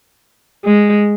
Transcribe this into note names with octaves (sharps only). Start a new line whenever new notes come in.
G#3